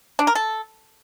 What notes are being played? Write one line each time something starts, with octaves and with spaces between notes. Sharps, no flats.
D4
A#4
A4